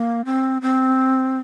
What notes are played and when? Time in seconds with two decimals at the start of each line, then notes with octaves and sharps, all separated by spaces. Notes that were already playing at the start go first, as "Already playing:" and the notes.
Already playing: A#3
0.25 C4
0.62 C4